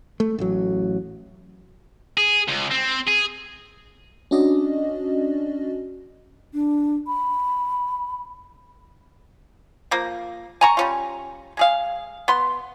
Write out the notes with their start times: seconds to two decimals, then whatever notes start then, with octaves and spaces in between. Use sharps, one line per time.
0.20 A3
0.39 A1 F#3
2.17 G#4
2.48 C#2
2.71 C4
3.07 G#4
4.31 C#4 D4 F#4 D5 D#5
6.53 D4
7.07 B5
9.91 F3 A#3
10.61 G#5 A#5 C#6
10.77 G3 C#4 F4
11.57 G#3 G#4 F5
12.28 B3 C6